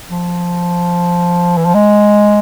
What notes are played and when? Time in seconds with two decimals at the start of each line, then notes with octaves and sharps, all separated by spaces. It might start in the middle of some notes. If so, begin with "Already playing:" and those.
0.10 F3
1.57 E3
1.65 F3
1.74 G#3